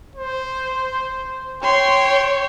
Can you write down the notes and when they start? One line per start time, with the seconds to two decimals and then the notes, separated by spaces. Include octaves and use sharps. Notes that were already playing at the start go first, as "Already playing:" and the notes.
0.16 C5
1.63 C#5 G5 C6